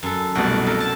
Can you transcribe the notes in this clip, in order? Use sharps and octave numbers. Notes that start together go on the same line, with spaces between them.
F#2 A4
C2 B2 A3 F#4 D5
A4 A#4
A5